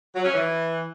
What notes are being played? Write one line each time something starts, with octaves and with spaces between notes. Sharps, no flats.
F#3
C#4
E3